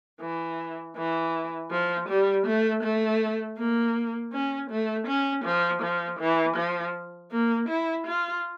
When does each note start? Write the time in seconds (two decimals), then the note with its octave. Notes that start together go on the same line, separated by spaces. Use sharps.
0.21 E3
0.97 E3
1.70 F3
2.08 G3
2.46 A3
2.83 A3
3.58 A#3
4.32 C#4
4.70 A3
5.07 C#4
5.44 F3
5.82 F3
6.19 E3
6.57 F3
7.32 A#3
7.68 E4
8.06 F4